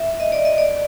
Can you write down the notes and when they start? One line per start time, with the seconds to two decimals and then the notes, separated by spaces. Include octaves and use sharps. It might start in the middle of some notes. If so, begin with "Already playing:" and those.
Already playing: E5
0.20 D#5
0.32 D5
0.45 D#5
0.58 D5